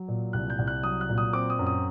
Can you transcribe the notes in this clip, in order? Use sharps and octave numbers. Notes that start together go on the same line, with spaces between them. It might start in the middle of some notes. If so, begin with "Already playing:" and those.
Already playing: F#3
A#2
C2 F#6
G6
C2
F#6
F#3 D#6
F#6
A#2
D#6
C4 D6
D#6
F#2
D#6